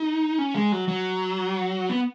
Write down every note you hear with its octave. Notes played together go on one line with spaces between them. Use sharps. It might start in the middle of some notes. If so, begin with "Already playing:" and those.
Already playing: D#4
C#4
G#3
F#3
F#3
B3